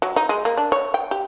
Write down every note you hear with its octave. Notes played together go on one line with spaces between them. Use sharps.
F#3
D#4
G#3
A#3
D4
C#5
G5
G4